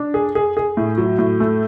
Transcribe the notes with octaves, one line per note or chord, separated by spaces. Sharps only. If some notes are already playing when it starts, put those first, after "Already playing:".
Already playing: D4
G#4
G#4
G#4
A2
F#3
A2
A3